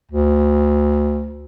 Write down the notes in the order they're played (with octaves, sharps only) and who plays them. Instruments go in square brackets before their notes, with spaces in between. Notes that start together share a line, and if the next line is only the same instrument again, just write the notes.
[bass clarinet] D2